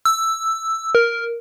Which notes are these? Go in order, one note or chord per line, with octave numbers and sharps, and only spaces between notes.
E6
A#4